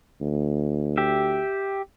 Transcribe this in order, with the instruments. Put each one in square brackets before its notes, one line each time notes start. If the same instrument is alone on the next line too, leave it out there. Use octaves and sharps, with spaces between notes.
[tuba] D2
[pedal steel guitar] G4 E5